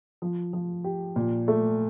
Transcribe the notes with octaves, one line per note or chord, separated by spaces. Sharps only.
F3
F3
G4
A#2
A3